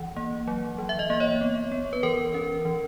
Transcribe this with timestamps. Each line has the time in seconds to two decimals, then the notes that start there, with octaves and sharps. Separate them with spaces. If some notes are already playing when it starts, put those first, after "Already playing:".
Already playing: E3 F#5
0.16 A#3
0.47 F#3
0.78 E3
0.89 E5
0.99 D#5
1.10 A#3 D#5
1.20 C#5
1.41 B3
1.72 B3
1.93 B4
2.03 E3 A#4
2.34 C#4
2.65 E3